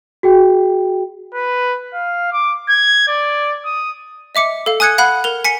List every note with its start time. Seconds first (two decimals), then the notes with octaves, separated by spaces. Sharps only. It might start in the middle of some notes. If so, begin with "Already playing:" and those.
0.23 F#4 G#4 G5
1.34 B4
1.94 F5
2.32 D6
2.70 G#6
3.08 D5
3.65 D#6
4.35 D#5 E5 D6 C#7
4.66 A4 F5
4.80 G#5 D#6 F#6 G#6 C#7
4.98 F5 F#5 B5 F#6
5.24 A#4 F7
5.45 G#5 B6 C#7